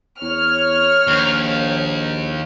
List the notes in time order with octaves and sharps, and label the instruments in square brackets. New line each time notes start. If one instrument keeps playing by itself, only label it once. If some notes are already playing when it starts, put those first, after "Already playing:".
[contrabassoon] E2 [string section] C#5 F6
[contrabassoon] A#1 [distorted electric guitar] D#2